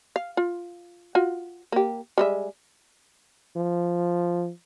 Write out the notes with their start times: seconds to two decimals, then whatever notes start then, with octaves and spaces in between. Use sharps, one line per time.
0.16 F5
0.37 F4
1.15 F4 F#4
1.72 A#3 G4
2.18 G3 G#3 E5
3.57 F3